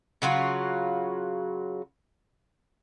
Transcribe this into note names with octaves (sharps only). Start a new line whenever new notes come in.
C#3 F#3 F4 F#4